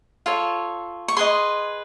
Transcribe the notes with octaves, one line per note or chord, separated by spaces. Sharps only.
F4 A4 C#5
C#6
G#4 B4 D#5 C6